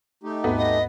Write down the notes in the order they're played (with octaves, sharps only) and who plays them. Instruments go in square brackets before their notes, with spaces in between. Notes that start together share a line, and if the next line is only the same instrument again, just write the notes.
[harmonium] A3 D#4 G4
[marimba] D#2 G#2 A4 [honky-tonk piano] B3
[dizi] D#5